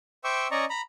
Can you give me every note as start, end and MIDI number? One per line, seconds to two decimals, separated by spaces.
0.24 0.47 72
0.24 0.47 76
0.24 0.47 79
0.24 0.47 85
0.24 0.47 86
0.24 0.47 88
0.51 0.65 61
0.51 0.65 74
0.51 0.65 75
0.51 0.65 82
0.51 0.65 85
0.70 0.81 82
0.70 0.81 83